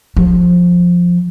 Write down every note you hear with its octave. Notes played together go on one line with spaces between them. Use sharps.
F3